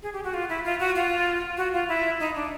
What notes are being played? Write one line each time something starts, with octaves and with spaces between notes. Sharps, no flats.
G#4
G4
F#4
F4
E4
F4
F#4
F4
F#4
F4
E4
D#4
D4